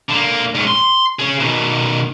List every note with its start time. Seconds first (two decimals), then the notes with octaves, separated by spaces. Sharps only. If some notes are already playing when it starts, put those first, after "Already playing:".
0.09 D3 A#3
0.55 G#2 C#4
0.67 C6
1.19 C#4 G#4
1.40 B2 D#3